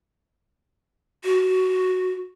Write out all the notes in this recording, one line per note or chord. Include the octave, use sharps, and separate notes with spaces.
F#4